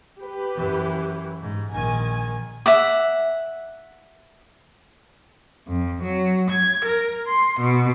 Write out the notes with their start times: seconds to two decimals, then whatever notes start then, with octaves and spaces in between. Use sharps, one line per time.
0.20 G4 B4
0.55 F#2 E3
1.42 G#2
1.72 A#1 D#3 G#5
2.66 E5 F#5 D6
5.68 F2
6.03 F#3
6.50 G#6
6.85 A#4
7.28 C6
7.61 B2